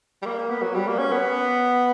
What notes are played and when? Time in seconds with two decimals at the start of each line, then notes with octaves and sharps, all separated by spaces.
0.22 G3
0.26 A#3
0.39 A#3
0.50 B3
0.62 F#3
0.75 G3
0.87 A#3
0.99 C#4
1.12 B3